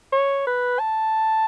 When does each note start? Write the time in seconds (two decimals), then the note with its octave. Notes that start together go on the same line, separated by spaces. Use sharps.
0.12 C#5
0.47 B4
0.79 A5